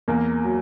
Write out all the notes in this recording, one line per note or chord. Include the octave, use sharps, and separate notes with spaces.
E2 A#3
F#3